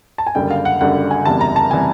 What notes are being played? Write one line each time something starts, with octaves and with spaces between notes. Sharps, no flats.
A5
G#5
F#1 F#2 D3 G3 G5
F5
F#5
F#1 F#2 D3 G3 F#5
G#5
F#1 E2 C3 E3 G3 A5
A#5
A5
C3 E3 G3 G#5